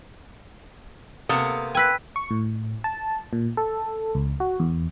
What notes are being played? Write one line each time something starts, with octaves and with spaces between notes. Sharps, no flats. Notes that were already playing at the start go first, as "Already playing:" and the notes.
C3 A#3 B3 A4 D#6
B4 G5 G#5 E6 B6
C#6
A2
A5
A#2
A4
C#2
F#4
E2